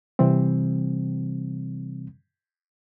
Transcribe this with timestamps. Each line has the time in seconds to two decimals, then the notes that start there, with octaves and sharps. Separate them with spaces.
0.19 C3 E3 G3 C4